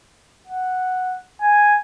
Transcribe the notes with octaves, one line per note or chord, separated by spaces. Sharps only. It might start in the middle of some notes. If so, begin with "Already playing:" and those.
F#5
G#5